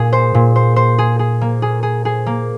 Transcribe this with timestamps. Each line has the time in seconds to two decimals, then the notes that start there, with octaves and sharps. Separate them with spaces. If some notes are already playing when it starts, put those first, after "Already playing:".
Already playing: A#2 G#4
0.13 C5
0.34 A#2
0.56 C5
0.76 C5
0.98 G#4
1.19 G#4
1.41 A#3
1.62 G#4
1.83 G#4
2.05 G#4
2.26 A#3